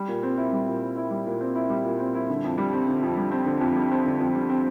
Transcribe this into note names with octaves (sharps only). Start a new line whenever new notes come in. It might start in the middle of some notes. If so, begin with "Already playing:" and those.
Already playing: G3
A#2
C4
E4
G3
A#2
C4
E4
G3
A#2
C4
E4
G3
A#2
C4
E4
D3
F2
G3
C4
D3
F2
G3
C4
D3
F2
G3
C4
D3
F2
G3
C4